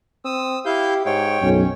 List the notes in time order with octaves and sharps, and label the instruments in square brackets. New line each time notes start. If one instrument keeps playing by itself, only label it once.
[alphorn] C4 [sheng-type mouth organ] D#6 E6
[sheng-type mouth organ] E4 F5 G6 [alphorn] G4
[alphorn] G#2 [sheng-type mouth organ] C#5 G5
[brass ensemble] B1 F#2 [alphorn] C#4